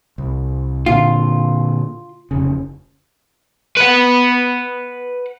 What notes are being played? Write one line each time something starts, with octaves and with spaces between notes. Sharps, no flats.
C2
A#2 D3 F4
F1 C#3
B4 F#5